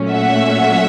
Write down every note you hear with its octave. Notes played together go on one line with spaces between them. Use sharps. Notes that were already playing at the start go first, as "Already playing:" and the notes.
Already playing: A#2 F#3 A3 C#4
E5 F#5